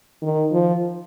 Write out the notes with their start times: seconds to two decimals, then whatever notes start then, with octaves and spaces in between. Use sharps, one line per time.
0.22 D#3
0.52 F3